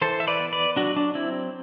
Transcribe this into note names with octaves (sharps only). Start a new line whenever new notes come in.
E3 A4 C5
E5
B4 D5
B3
B4 D5
F#3 D4 F#4
D4
C4 E4